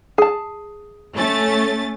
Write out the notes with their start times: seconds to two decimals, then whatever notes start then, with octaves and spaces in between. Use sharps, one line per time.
0.18 G#4 A5
1.16 A3 C#4 A6